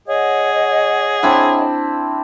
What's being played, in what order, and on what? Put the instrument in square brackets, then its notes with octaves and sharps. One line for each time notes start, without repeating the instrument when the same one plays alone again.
[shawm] G#4 [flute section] C#5 D#5 F#5
[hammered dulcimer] C4 D4 E4